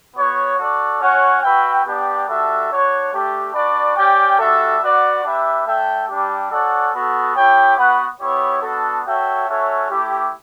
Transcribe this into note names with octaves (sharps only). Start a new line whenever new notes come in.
B3 F#4 C#5
F#4 A4 D5
C#4 F#4 C#5 F#5
F#4 B4 E5 G5
B3 D4 G4 D5 G5
G3 D4 F#4 A4 E5
D4 F#4 C#5
A3 D4 G4
D4 F#4 B4 D5
C#4 G4 D5 G5
G3 D4 F#4 A4 E5
F#4 B4 D5 F#5
D4 G4 B4 E5
A3 D4 A4 E5 G5
G3 D4 G4
C#4 F#4 A4 D5 F#5
B3 F#4 A4
E4 G4 C#5 G5
B3 F#4 B4 F#5
B3 E4 G4 C#5
B3 D4 F#4 A4
F#4 A4 C#5 E5 G5
C#4 F#4 A4 C#5 E5
A3 E4 G4